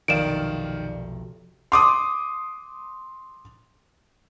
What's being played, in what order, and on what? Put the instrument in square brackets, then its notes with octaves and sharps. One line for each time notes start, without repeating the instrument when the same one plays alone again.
[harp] F1 B1 [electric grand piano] D#3 D5 F5 [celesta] D7 E7
[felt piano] C6 D6 D#6